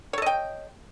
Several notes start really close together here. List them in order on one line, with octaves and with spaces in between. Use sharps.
C#5 A4 D#5 G5